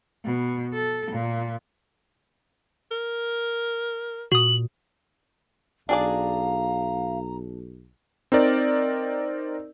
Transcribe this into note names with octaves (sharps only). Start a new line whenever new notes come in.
B2
A4
A#2
A#4
A#2 F#4 D#6 F#7
B1 D4 G#4 D5 F5 A#5
C4 D#4 A#4 D5